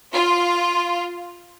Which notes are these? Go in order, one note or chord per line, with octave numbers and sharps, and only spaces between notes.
F4